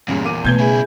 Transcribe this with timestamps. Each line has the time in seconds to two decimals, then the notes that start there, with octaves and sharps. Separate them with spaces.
0.08 E2 G2 A#2 C#3
0.25 A#3 D6 D#7
0.44 B2 A3 B4 G6 G#6 G7
0.58 C#3 E4 G#4 G#5